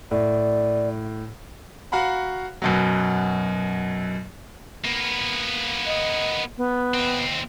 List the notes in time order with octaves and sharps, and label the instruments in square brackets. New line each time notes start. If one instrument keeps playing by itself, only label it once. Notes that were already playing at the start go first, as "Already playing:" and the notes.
[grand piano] A2 [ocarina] D5
[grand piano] F#4 F5 F#5 A#5 B5
F#2 B2 F#3
[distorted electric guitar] A#3 B3
[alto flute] D#5
B3
[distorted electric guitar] D#2 C4